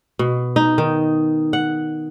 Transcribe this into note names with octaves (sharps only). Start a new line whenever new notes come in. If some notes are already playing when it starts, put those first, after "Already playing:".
B2
D#4
D#3
F#5